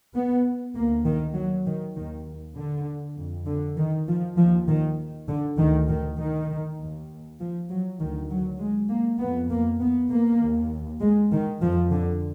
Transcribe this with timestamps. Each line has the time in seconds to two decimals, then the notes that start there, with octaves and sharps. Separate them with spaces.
0.14 B3
0.75 D2 A#3
1.05 D#3
1.35 F#3
1.66 D#3
1.96 D#2 D#3
2.57 D3
3.17 F2
3.46 D3
3.78 D#3
4.07 F3
4.37 D#2 F3
4.68 D#3
5.29 D3
5.58 D2 D#3
5.89 D#3
6.18 D#3
6.79 D#2
7.39 F3
7.69 F#3
7.99 D2 D#3
8.30 F#3
8.60 G#3
8.89 A#3
9.20 F2 B3
9.50 A#3
9.81 B3
10.11 A#3
10.41 D#2
11.01 G#3
11.32 D#3
11.62 F2 F3
11.91 D3